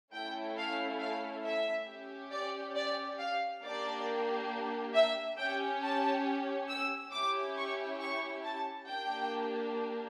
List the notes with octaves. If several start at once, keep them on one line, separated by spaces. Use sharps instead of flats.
A3 C#4 E4 A4 G5
F5
F5
E5
C#4 G4
D5
D5
F5
A#3 D4 G4 D5
E5
C#4 G4 G5
A5
E6
C#4 E4 G4 D6
C#6
C#6
A5
A#3 D4 G4 G5